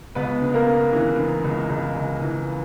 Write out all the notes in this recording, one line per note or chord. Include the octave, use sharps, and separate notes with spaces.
C#2 B3 B4
C#3
A#3 A#4
C#3
E3
C#3
C#2
C#2
C#2
E3